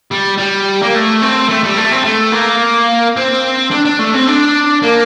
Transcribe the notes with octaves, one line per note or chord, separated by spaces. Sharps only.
G3
G3
A#3
A3
C4
A3
G3
A3
C4
A3
A#3
C4
D4
D4
A3
C4
D4
A#3